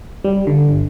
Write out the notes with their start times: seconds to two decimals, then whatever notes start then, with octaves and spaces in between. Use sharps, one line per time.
0.24 G3
0.47 D3
0.69 G1